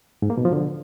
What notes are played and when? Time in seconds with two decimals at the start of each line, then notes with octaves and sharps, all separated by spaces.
0.22 G#2
0.30 A#3
0.38 B2
0.45 F3
0.53 D3